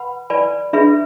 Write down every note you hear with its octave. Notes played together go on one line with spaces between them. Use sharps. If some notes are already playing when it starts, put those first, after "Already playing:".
Already playing: B4 F#5 B5
B4 D5 G#5 B5
D4 G#4 B4 E5 B5